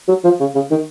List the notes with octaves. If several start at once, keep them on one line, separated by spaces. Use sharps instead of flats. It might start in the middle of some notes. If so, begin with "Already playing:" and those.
F#3
F3
C#3
C#3
D#3